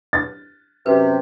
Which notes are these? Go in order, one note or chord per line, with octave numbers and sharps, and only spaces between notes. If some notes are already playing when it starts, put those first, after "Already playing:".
A6
F#2 C3 B4